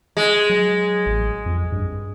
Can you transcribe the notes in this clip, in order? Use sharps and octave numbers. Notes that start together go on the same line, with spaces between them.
G#3
F#3
A1
F2
G2